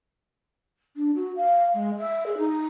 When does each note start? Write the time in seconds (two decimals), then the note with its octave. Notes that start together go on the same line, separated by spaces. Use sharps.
0.96 D4
1.15 F#4
1.36 F5
1.74 G#3
1.98 E5
2.26 G#4
2.38 D#4